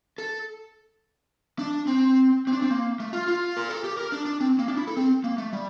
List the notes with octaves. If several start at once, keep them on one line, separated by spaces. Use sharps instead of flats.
A4
D4
C4
C4
D4
C4
A#3
A3
F4
F4
A#4
A4
G4
A#4
D4
D4
C4
A#3
D4
E4
A4
C4
A#3
A3
G3